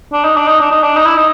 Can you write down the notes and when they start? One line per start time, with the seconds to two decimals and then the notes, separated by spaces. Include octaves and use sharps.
0.13 D4
0.24 D#4
0.37 D4
0.48 D#4
0.60 D4
0.71 D#4
0.83 D4
0.97 D#4
1.05 E4
1.16 D#4